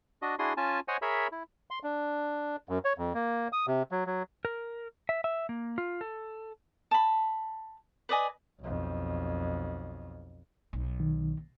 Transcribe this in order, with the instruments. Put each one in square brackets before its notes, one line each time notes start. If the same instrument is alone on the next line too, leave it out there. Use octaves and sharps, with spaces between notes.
[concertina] D4 F#4 D#5
D4 E4 F#4 G#4 C6 D#6
C#4 F4 G#5 A5
C5 C#5 D#5 F#5 G#5
G#4 A#4 C#5 E5 B5
E4
[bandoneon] C6
D4
F#2
C#5
F2
A#3
D#6
C3
F#3
F#3
[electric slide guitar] A#4
E5
E5
A#3
F4
A4
[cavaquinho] A5 B5
B4 D5 D#5 G#5
[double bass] B1 F2
[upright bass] B1
[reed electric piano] D#3